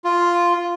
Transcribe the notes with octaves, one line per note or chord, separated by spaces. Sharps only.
F4